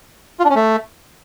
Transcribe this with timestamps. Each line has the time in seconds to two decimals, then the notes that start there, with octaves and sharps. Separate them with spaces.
0.40 F4
0.45 D4
0.50 C#4
0.55 A3